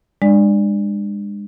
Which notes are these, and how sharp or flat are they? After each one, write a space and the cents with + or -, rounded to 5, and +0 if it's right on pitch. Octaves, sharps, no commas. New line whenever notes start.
G#3 -30 D4 +35 D5 +0